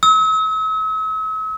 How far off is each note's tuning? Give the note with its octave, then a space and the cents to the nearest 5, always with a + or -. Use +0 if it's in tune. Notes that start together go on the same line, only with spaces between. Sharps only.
E6 -45